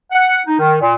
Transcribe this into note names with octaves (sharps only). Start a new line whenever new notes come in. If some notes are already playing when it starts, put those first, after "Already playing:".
F#5
D#4
D#3
A#2